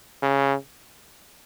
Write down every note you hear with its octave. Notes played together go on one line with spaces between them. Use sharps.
C#3